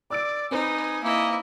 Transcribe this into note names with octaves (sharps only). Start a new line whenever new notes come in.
D5 D6 E6 D7
C4 D#4 B4 C5 G#5
A#3 E4 D#5